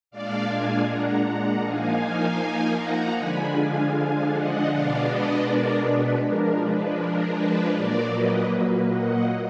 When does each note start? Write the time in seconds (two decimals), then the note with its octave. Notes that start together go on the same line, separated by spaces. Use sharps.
0.11 A#2 G#3 D4 D5 F5
0.49 F5 G#5
0.87 F#5 A#5
1.25 F#5 A#5
1.63 F3 A#3 D#4 F5 G#5
2.78 F#5 A#5
3.16 D3 F3 G#3 D4 G#5 B5
3.54 F5 G#5
3.92 F5 G#5
4.31 D#5 F#5
4.69 B2 G#3 B3 D4 D5 F5
5.06 B4 D#5
5.45 A#4 D5
5.84 B4
6.21 F3 G#3 D4 A#4
6.59 B4
6.98 A#4
7.35 B4
7.74 A#2 F#3 A#3 A#4 D5
8.12 B4 D#5
8.51 B4
8.88 D#5 F#5